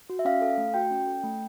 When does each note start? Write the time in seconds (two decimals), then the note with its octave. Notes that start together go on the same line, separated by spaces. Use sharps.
0.10 F#4
0.19 E5
0.25 C#4 F5
0.41 A4
0.58 A3
0.74 F#4 G5
0.91 C#4
1.07 A4
1.24 A3